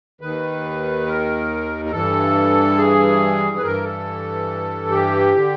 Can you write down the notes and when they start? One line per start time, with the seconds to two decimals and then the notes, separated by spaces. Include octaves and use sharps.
0.21 D#2 D#3 B4
1.06 A#4
1.85 A#4
1.91 G2 E3 A4
2.77 G#4
3.57 B4
3.62 G2 E3 A#4
3.84 A4
4.91 G4
5.35 D3